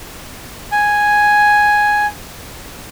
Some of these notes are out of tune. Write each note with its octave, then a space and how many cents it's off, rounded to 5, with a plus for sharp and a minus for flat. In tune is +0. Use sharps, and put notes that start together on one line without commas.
G#5 +0